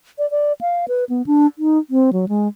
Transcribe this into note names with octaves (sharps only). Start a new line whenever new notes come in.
D5
D5
F5
B4
B3
D4
D#4
C4
F#3
G#3